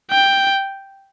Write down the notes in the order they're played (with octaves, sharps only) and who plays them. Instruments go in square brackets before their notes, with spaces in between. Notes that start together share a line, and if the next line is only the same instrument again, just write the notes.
[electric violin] G5